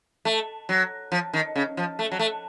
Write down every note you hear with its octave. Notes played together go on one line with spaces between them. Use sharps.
A3
F#3
F3
D#3
C#3
F3
A3
F#3
A3